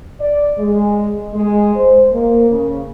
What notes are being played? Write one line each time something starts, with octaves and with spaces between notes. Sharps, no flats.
D5
G#3
G#3
C5
A#3
C#3